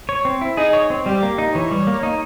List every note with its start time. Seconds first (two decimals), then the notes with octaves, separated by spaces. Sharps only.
0.09 C#5
0.25 C4
0.41 E4
0.57 D#4 G#4
0.73 C#5
0.90 C4
1.06 G3 G4
1.23 A#3
1.38 D#4
1.54 E3 C#5
1.71 G3
1.87 A#3
2.03 D#4